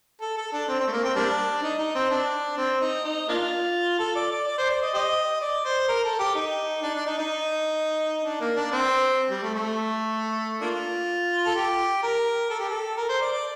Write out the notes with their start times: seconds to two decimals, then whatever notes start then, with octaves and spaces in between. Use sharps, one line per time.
0.21 A4
0.37 A4
0.53 D4
0.68 C4
0.80 C4
0.88 A3
0.92 A#3
1.04 C4
1.16 G3 A#3 D4
1.63 D#4
1.79 D#4
1.95 C4
2.10 D4
2.57 C4
2.81 D#4
3.04 D#4
3.29 A#3 D4 F4
3.99 A4
4.15 D5
4.31 D5
4.47 D5
4.58 C5
4.70 D5
4.82 D#5
4.94 G4 C5 D#5
5.41 D5
5.65 C5
5.88 A#4
6.04 A4
6.19 G4
6.35 D#4
6.83 D4
6.95 D4
7.06 D#4
7.18 D#4
8.24 D4
8.41 A#3
8.56 D4
8.72 C4
9.31 G3
9.42 A3
9.55 A3
10.61 A#3 D4 F4
11.46 A4
11.55 G4
12.03 A#4
12.50 A4
12.60 G4
12.69 A4
12.97 A#4
13.09 C5
13.21 D5
13.32 D5